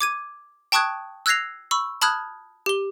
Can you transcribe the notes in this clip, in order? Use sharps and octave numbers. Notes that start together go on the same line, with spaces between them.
D6 G#6 D#7
G5 A5 C#6 D#6 F#6 G#6
E6 F#6 G#6 A#6 C7 F7
B5 C#6 E6
A5 B5 D#6 F6 F#6 G#6
G4 G7